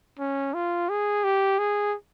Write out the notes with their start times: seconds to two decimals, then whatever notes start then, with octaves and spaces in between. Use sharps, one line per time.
0.19 C#4
0.54 F4
0.89 G#4
1.24 G4
1.58 G#4